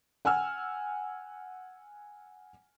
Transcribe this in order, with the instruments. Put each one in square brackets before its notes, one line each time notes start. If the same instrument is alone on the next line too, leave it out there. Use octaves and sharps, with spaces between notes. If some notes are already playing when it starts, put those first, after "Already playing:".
[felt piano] F#5 G#5 E6 F6